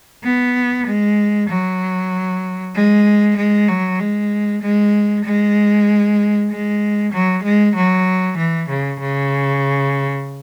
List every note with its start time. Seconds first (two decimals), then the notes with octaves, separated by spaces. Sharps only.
0.24 B3
0.86 G#3
1.49 F#3
2.74 G#3
3.36 G#3
3.68 F#3
3.99 G#3
4.61 G#3
5.24 G#3
6.49 G#3
7.12 F#3
7.43 G#3
7.75 F#3
8.37 E3
8.68 C#3
8.99 C#3